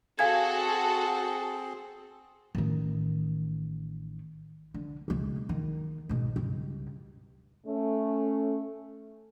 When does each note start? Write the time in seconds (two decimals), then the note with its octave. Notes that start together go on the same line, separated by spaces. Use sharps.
0.19 C4 F#4 G#4 A4 F5 G#5 G#6
2.55 A1 D#3
4.74 D3
5.08 C#2 B2
5.49 D#3
6.09 G#2 B2
6.36 C#2 G2
7.66 A3 C#4